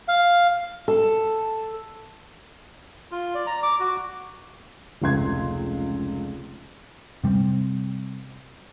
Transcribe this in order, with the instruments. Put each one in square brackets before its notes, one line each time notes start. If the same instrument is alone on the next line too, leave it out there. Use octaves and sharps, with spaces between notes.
[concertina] F5
[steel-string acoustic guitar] A4
[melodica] F4
D5
A#5
D6
F#4
[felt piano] F1 C#2 C6 G#6
[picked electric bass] C3 G3 A#3 C4